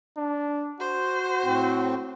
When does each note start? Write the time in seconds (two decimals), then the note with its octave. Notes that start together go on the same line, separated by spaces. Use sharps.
0.17 D4
0.80 F#4 C5
1.44 A2 C4